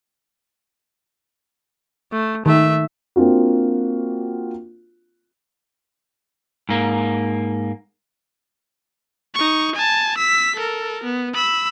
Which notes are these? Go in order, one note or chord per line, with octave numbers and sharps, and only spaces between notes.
A3
D#3 A3 E5
A#3 C4 D4 F4 F#4
G#2 A#3
D#4 C#6
G#5 A5
E6 B6
A4 A#4
B3
B5 E6